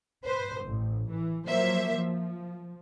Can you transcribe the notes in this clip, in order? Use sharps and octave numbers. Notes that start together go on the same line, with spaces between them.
B4 C5
A1
E3
F3 F#3 A#3 C5 E5
F3